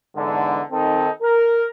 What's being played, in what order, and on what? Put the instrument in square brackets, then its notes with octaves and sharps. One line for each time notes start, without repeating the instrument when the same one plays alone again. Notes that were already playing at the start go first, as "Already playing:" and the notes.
[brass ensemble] E2 G#2 D3
D#3 C4 D#4 A4
A#4